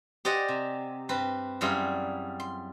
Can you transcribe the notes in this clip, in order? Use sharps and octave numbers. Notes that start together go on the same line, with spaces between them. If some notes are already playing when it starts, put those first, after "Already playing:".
G4 C5 D5 D#5 F#5 G#5
C3
G2 C4 B4
F#2 E3 G3 F4 G#4 C6
C6